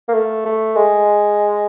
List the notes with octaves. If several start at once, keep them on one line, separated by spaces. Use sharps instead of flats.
A#3
A3
A3
G#3